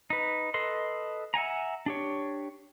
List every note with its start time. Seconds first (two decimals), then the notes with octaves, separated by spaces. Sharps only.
0.10 D#4 B4
0.54 A4 B4 D#5 C6
1.34 E5 F#5 G#5 A#5
1.86 D4 G4 C#5